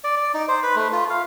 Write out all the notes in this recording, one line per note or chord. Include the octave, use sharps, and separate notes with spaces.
D5
D5
D#4
C5
B4
A3
F4
F5